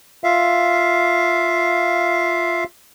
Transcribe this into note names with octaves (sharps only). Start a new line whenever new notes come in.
F4 E5 F5